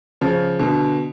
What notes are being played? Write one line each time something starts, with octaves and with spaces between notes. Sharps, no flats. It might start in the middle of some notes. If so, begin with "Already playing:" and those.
C#3 F3
B2 D3